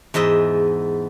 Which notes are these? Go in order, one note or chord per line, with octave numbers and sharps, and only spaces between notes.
E2 G#2 D#5 E5